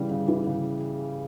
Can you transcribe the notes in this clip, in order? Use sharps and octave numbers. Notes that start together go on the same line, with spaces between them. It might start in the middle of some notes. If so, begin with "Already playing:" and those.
Already playing: C#3 E3 G3
C#3
E3
C#3